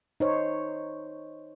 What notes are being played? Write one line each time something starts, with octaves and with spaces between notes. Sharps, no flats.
D#4 C5 C#5